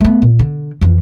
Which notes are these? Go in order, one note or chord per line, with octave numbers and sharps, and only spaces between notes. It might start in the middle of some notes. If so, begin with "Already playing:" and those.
A3 B3
A#2
D3
F2 E3